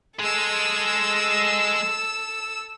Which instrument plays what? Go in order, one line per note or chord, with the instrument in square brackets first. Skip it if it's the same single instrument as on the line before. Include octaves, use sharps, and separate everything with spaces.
[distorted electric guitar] G#3 G#4 [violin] A4 E6